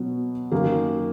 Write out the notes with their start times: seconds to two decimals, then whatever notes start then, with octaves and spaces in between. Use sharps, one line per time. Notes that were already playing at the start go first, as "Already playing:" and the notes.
Already playing: B2 F#3 B3
0.52 F#2 D#3 A#3